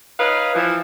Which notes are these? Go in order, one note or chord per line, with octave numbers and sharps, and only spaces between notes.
D#4 B4 C#5 F5
E3 F3